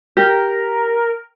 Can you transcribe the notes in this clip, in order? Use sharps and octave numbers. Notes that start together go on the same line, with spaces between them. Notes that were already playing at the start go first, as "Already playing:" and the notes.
G4 A#4